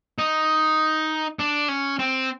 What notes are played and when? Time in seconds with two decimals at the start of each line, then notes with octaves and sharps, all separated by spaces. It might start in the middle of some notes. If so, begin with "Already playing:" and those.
0.18 D#4
1.39 D4
1.68 C#4
1.99 C4